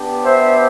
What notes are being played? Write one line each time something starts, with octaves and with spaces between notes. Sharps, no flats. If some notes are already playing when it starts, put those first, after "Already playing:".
Already playing: B3 D4 G4
C5 E5